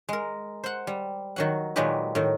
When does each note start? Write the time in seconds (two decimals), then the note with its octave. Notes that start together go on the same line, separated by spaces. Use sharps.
0.09 G#3 A#4
0.64 C5 F#5
0.87 G3
1.36 D#3 F#3 F#5
1.76 A#2 D#3 F#3 G#3 G4 B4
2.15 A2 D#3